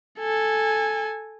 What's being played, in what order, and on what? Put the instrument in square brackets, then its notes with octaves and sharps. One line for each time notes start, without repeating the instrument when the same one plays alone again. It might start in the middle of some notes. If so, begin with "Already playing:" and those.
[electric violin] A4 G#5